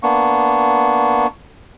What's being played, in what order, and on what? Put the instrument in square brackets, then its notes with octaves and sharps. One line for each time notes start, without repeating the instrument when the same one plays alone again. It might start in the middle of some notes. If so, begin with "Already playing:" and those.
[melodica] A#3 B3 D4 C#6